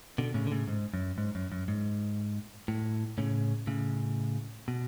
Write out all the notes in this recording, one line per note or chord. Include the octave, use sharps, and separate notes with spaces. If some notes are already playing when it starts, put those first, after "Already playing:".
B2 D3
A2 C#3
D3
A2 C#3
G#2
F#2
G#2
F#2
F#2
G#2
A2
A2 C#3
A2 C#3
B2